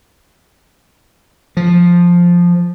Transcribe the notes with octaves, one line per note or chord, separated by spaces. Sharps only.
F3